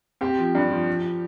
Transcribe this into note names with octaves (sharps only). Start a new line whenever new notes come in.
C4 G4
F3
G2
F3
F3